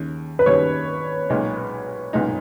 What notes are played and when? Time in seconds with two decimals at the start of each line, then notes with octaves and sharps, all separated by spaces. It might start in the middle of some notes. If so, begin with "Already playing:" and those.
Already playing: D#2 C#3
0.39 B4
0.46 D#2 C#3 G3 C#5
1.30 B1 A#2 G#3 D#4
2.13 B1 A#2 G#3 D#4